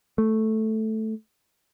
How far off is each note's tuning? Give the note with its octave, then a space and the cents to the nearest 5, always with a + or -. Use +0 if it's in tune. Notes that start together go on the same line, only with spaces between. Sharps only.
A3 -5